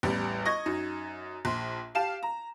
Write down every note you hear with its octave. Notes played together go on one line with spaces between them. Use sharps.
A1 E2 G3
D#5 C#6 G#6 A#6
F#2 D#4
A#1 C6
G4 F5 A5 E7
A#5